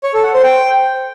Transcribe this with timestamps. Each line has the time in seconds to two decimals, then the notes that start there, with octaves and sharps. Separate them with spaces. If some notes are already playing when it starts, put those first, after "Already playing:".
0.04 C#5
0.14 A4
0.24 F#5
0.34 C5
0.43 G5